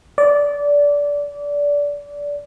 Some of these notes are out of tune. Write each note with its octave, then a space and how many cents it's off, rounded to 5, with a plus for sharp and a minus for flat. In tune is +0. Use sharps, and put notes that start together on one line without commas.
D5 -20